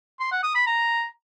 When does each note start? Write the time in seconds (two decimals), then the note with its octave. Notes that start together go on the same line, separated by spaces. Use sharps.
0.20 C6
0.32 F#5
0.43 D#6
0.55 B5
0.67 A#5